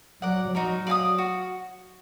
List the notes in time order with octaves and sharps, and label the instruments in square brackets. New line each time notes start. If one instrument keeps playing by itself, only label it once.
[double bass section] F#3 [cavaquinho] A#4 D5 F#5
[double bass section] F#3 [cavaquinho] D#4 F#4 A#4
[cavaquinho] D5 F5 G#5 D#6
F#4